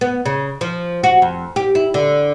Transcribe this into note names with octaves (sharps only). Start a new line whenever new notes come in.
B3
C#3
F3
F#4
F2
G4
E4
D3